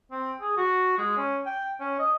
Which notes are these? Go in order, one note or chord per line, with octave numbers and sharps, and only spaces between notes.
C4
G#4
F#4
G#3
C#4
G5
C#4
D#5